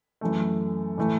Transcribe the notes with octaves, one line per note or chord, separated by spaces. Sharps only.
F#2 E3 A3
A2 E3 A3